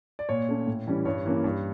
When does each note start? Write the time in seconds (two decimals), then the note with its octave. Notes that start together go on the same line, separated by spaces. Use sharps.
0.19 D5
0.29 A#2 C#5
0.49 A3 C#4
0.67 A2
0.87 E3 G3 C#4
1.05 G2 C#5
1.25 E3 A#3 C#4
1.44 G2